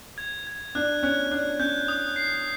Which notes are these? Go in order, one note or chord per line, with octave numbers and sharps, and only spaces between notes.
G#6
G#6
D4 F#6
C#4 F#6
D4 F#6
C#4 G6
D#6
C7